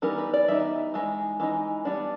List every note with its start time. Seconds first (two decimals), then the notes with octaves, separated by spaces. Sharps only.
0.02 E3 G3 B3 D#4 A#4
0.18 B4
0.34 D5
0.48 E3 G3 B3 D#4 E5
0.94 E3 G#3 D#4
1.40 E3 G#3 D#4
1.85 G3 B3 D4